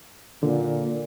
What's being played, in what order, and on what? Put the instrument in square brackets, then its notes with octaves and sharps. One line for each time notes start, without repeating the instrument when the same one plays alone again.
[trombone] A#2 [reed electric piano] D3